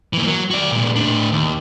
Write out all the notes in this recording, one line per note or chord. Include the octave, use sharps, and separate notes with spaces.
E3 A#3
F#3
F#4 D5
A#2 G#3
A2 D4
D#2